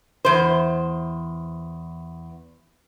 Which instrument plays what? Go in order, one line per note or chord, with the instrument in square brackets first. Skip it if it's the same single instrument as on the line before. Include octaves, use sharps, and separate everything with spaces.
[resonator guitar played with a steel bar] E2 C5